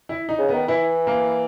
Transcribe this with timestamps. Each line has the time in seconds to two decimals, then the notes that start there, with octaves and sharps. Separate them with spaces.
0.09 E4
0.29 D#4
0.38 C#3
0.48 D#3 B3
0.68 E3 E4
1.07 A#3